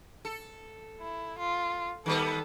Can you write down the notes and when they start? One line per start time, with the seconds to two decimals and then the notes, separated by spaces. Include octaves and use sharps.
0.25 A4
1.01 E4
1.38 F4
2.06 D#3 G3 B3 A4